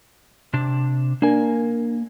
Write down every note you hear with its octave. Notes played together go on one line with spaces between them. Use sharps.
C3 D4
A#3 D4 A#4 G#5